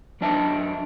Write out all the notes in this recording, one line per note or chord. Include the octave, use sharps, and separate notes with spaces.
F#2 F#3 D4 D#5 E5 A5